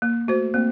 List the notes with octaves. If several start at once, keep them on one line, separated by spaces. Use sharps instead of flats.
A#3
A3 F#4 C5
A#3 C4